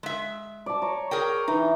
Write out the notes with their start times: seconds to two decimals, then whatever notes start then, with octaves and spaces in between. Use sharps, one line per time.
0.03 G#3 E5
0.66 D5 A5
0.82 C#5 A#5
1.11 G#4 A#4 G5
1.48 E3 D#4